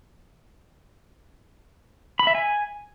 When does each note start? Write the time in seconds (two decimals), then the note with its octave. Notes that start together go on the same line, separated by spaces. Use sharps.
2.19 B5
2.27 E5
2.35 G#5